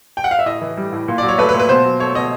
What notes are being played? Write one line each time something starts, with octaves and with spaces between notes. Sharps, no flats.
G5
F#5
F5
E5
A2 D#5
E3
G3
A2
A#2
F#3 D5
C#5
A3 B4
B4
A#2
B4
B2 C5
F#3
A3 C#5
B2 D#5